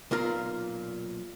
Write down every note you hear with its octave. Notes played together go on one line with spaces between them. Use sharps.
B1 A#2 F4 A#4